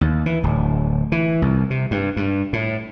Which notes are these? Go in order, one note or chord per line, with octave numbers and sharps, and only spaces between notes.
D#2
E3
D1
E3
C2
C3
G2
G2
A2